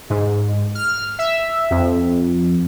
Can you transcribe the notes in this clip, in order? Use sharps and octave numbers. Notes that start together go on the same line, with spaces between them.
G#2
F6
E5
F2